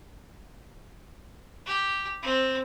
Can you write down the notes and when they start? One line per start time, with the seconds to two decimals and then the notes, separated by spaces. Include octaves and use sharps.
1.66 G4
2.23 C4